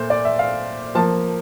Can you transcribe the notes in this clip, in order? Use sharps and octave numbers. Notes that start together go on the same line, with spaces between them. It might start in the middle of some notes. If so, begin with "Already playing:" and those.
Already playing: A#2 A3 C5
D5
E5
F5
F3 A#3 A5